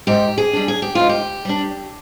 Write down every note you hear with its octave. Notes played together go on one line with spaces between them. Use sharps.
G#2 G4
G#4
G3 D4
G#4
G4
G#2 F4
G4
G3 D4